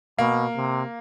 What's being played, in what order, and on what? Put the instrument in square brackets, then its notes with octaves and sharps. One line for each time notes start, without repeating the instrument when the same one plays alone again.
[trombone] B2 [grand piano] A#3
[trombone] C3